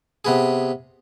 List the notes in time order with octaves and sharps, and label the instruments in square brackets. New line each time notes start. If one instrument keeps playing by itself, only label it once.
[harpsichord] C3 B3 G#4